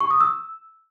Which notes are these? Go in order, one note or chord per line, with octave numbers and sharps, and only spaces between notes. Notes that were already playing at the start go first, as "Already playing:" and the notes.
C#6
D#6
E6